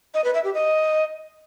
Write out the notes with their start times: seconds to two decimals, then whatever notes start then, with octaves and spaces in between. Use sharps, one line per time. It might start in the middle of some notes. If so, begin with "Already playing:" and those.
0.14 D#5
0.24 B4
0.34 E5
0.44 G4
0.54 D#5